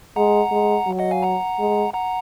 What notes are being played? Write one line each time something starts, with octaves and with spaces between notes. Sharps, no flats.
G#3 F#5 A#5
G#3
F#3
D#5 F#5
F5 G#5
F#5 A#5
G#3
F#5 A#5